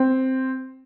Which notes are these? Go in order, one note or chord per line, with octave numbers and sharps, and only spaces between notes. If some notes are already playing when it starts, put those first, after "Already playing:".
Already playing: C4